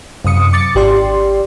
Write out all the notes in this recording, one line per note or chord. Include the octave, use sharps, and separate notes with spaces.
F#2 C3 D#6 C#7
D6 A6 C#7
G#1 G4 D5 C6